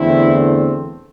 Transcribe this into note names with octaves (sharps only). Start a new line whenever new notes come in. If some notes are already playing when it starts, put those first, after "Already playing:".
Already playing: E2 D3 A3 C4 E4